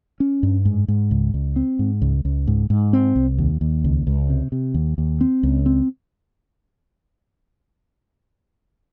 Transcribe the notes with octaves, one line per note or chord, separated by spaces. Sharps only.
C#4
G2
G#2
G#2
C#2
C#2
C4
G#2
C#2
C#2
G#2
G#2
C4
C2
D#2
D#2
C#2
C#2
C3
C3
D#2
D#2
C4
C#2
C4